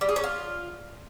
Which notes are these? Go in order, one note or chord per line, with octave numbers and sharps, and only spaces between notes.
G3
G#4
C#4
F4